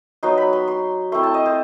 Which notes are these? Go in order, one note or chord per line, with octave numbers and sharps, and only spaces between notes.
F#3 B3 D#4 C6
B5
C6
C6
A3 C4 E4 C6
A5
D#5
C5